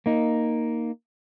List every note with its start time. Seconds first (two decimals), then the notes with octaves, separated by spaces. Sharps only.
0.06 A#3 D#4